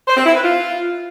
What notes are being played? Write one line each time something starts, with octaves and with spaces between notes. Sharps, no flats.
C5
C4
E4
B4
F4